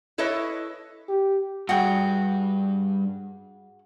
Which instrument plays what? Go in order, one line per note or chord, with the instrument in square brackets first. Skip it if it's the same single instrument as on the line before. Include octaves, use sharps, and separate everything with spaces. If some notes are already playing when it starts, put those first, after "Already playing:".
[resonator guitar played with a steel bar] E4 A4 B4 C#5 D#5 E5
[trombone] G4
[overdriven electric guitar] G2 [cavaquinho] F#4 G#4 G5